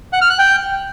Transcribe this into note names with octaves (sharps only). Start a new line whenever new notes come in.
F#5
F6
F#6
G5